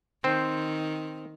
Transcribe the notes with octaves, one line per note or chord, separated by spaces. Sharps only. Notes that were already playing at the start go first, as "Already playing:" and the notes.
D#3 C4 C5